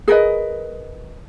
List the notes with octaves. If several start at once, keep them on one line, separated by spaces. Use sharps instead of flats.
G#4 A#4 B4 D#5